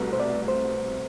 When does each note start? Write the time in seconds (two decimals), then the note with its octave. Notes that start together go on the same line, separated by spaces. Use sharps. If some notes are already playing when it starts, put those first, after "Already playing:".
Already playing: C2 B2 A3 B4
0.13 C5
0.20 D5
0.48 C5